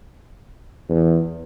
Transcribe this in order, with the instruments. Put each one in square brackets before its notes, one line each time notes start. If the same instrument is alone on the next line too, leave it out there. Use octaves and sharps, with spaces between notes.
[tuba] E2